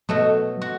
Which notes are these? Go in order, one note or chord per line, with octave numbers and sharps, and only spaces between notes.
B2 F#3 A3 F#4
F#4